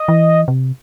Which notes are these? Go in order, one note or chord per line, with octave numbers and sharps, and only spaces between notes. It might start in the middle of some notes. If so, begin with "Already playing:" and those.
Already playing: D#5
E3
C3